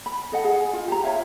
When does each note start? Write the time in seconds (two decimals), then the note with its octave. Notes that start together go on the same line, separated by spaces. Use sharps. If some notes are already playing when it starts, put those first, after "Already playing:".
0.06 B5
0.32 A4 D#5 F#5
0.44 G#4
0.73 F4
0.88 G4 G#5 A#5
1.03 F4 C#5 E5 F5